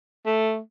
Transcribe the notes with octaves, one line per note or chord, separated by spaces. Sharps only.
A3